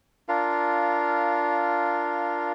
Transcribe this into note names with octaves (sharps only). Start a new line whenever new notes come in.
D4 F4 A#4 F5